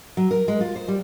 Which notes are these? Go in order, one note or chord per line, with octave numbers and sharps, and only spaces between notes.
F#3
A#4
G#3
F4
C5
G3